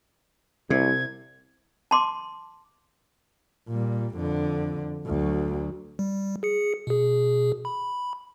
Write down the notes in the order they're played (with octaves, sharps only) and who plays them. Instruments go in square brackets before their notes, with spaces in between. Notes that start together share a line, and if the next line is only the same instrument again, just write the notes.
[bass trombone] C2 [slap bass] C3 [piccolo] G#6
[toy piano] A5 C6 D6
[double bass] A#2 G3
F2 D3
D2 F#3
[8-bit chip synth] G3
G#4 C#7
B2 G#4
B5